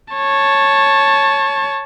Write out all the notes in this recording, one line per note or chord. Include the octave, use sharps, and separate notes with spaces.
C#5 A5